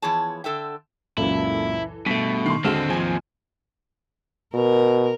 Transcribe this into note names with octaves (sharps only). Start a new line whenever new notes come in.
E3 F3 B3 G#4 C#5 A5
D3 A4 E5 G5
C#2 F#2 A#2 E3 E4 A4
G2 B2 A3 B6
D#3 C6 C#6 C7
D#2 D3 G#3 C4 F#4 A4 F6
F3 G#5
B2 A#4